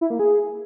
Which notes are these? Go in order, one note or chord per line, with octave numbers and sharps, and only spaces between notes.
E4
A#3
G#4